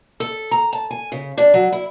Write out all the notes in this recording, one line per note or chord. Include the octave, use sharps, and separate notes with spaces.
A4
A#5
A5
G#5
C#3
D4
F#3
E4